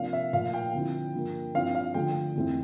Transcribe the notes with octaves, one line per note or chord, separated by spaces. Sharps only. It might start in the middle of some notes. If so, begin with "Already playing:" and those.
Already playing: C3 F3 A#3 D4 F5
E5
A#2 F3 A3 F5
G5
D3 F3 C4 E4
G2 F3 A#3
G2 F3 C4 E4 F5
F5
D3 F3 A3 G5
F2 E3 A3 C4 E4